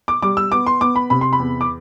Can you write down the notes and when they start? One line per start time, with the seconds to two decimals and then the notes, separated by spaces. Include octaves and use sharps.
0.08 D6
0.22 G3 D6
0.37 E6
0.51 B3 D6
0.67 C6
0.81 B3 D6
0.96 B5
1.10 C3 B5
1.21 C6
1.33 B5
1.39 E2
1.61 D6